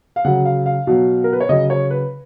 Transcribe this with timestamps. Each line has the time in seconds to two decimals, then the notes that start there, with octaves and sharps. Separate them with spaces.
0.16 F5
0.25 C#3 F#3 F#5
0.45 F5
0.66 F5
0.87 B2 F#3
1.24 A#4
1.33 B4
1.40 C#5
1.49 C#3 F#3 D#5
1.70 C#5
1.91 B4